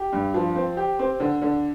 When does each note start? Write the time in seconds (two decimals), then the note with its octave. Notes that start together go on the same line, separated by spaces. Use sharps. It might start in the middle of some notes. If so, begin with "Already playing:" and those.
Already playing: G4
0.13 G2
0.34 F3
0.55 C4
0.77 G4
0.99 C4
1.20 D3
1.42 D3